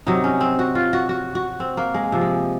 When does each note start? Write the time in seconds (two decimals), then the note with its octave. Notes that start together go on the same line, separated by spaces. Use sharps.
0.07 C3 F#3 D#4
0.24 C#4
0.41 C4
0.59 F#4
0.75 F4
0.93 F#4
1.09 F#4
1.35 F#4
1.60 C4
1.77 A#3
1.94 G#3
2.12 C3 F3
2.21 G#3